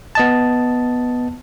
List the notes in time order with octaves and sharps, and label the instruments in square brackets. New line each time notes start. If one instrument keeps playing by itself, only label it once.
[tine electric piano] B3 D#5 A5